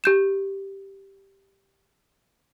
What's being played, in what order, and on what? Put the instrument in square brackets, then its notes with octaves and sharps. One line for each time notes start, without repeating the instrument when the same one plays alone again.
[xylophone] G4 G6 E7